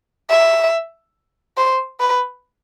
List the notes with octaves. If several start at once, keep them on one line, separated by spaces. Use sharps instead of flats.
E5
C5
B4